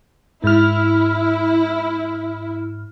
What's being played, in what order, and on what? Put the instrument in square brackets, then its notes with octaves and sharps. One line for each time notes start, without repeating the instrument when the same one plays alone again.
[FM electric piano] G#2 F6 [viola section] E4